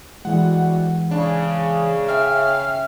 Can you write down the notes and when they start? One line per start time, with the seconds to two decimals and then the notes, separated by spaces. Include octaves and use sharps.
0.25 D2 E3 G3 G#3 F#4 F#5
1.11 C#3 D4
2.08 E5 G5 F6